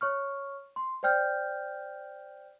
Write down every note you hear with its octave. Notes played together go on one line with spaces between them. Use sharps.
C#5 C#6 F6
C6
C5 D5 G5 F6 G6